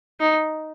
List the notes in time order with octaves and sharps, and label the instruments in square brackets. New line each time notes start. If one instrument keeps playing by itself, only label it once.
[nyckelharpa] D#4